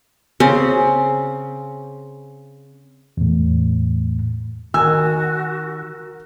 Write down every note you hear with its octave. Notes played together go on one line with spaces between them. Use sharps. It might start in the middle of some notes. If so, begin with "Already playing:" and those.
C#3 C4
E2 A2
D#3 F#4 A#4 G#5 E6